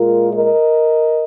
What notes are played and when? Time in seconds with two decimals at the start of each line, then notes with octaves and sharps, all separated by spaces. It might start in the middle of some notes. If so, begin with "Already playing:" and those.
Already playing: A#2 G#3 F4 A#4
0.33 A#4 D#5